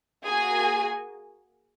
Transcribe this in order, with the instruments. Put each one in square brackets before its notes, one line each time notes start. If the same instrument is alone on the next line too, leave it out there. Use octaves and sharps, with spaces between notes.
[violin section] A#3 F#4 G#4 G#5